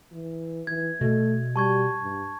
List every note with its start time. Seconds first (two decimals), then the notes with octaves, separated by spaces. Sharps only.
0.12 E3
0.67 E3 G#6
1.01 B2 A3
1.56 G3 A5 C#6 G#6
2.02 G2